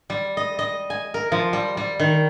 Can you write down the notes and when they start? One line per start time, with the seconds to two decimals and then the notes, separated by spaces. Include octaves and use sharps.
0.10 G3
0.37 D#5
0.59 D#5
0.90 G#5
1.14 A#4
1.32 F3
1.53 G3
1.77 G3
1.99 D#3